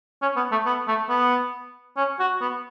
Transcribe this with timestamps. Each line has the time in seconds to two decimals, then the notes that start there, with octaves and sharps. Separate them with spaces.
0.22 C#4
0.36 B3
0.51 A3
0.66 B3
0.88 A3
1.09 B3
1.97 C#4
2.20 F#4
2.41 B3